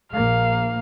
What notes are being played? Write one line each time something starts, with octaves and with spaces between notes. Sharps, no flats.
A#1 A#3 F5